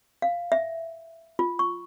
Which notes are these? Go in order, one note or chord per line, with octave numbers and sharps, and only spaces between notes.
F5
E5
F4
C#6